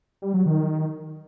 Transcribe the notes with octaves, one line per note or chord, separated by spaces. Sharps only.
G3
F#3
D#3